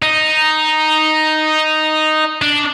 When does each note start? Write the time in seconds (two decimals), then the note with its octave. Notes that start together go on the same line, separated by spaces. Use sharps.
0.02 D#4
2.42 D4